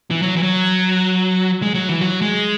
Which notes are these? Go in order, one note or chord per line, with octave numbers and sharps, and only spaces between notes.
E3
F#3
E3
F#3
G#3
F#3
E3
F#3
G#3